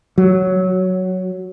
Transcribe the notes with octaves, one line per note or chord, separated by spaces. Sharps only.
F#3